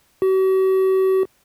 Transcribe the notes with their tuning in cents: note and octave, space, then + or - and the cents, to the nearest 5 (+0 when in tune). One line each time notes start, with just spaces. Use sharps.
F#4 +45